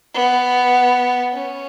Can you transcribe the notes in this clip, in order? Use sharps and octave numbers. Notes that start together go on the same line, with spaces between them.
B3
C#4